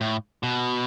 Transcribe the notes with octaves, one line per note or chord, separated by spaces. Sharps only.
A2
B2